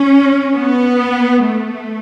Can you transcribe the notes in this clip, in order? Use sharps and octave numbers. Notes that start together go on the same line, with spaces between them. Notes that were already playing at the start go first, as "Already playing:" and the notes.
Already playing: C#4
B3
A3